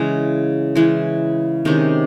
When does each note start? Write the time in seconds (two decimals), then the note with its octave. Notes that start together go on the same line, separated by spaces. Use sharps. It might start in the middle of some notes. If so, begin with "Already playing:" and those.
Already playing: C#3 E3 G#3
0.75 C#3 E3 G#3
1.65 C3 D#3 G#3 C#4